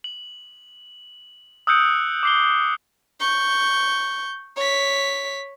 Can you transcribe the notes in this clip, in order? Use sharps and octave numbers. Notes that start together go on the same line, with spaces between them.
F#7
D#6 E6 F#6 G6 C#7 D7
D6 C7 G7
C#6 G6
C#5 B6